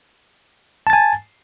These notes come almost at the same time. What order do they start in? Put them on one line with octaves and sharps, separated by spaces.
A5 A6 G#5